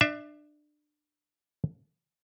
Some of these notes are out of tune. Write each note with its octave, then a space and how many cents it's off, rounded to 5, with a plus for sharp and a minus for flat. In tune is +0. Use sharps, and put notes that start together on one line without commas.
D4 +25 E5 +0